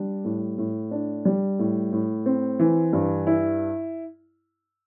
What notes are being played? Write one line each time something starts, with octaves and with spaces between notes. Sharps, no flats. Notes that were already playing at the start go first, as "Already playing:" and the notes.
Already playing: G3 D4
A2
A2
D4
G3
A2
A2
C4
E3
G2
E4